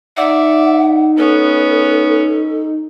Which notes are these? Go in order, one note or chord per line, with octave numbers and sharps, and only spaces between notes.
D#4 D5 E5 F#5
B3 C#4 A4